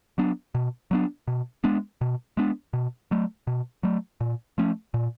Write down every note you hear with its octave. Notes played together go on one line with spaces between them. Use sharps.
F#3 B3 D4
B2
F#3 B3 D4
B2
G#3 B3 D4
B2
G#3 B3 D4
B2
F#3 A3
B2
F#3 A3
A#2
F3 A3 C#4
A#2